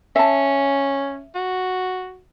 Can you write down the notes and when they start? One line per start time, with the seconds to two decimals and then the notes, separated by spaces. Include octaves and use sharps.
0.16 C#4 E5 A5
1.35 F#4